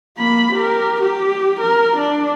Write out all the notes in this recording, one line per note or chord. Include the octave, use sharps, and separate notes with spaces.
A#3 B5
G4 A#4
G4
A#4
D4